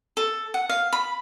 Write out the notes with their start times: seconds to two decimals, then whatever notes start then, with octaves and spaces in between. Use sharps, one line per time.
0.17 A4
0.54 F#5
0.69 F5
0.93 B5